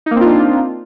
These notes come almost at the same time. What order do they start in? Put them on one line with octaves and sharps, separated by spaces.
D#4 A#3 C4 F4 D4